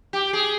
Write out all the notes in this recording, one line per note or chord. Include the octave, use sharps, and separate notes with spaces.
G4
G#4